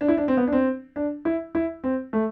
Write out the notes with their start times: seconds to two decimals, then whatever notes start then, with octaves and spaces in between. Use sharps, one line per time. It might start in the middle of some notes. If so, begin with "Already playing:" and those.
0.01 D4
0.08 E4
0.17 D4
0.28 C4
0.37 B3
0.47 D4
0.52 C4
0.96 D4
1.25 E4
1.55 E4
1.84 C4
2.13 A3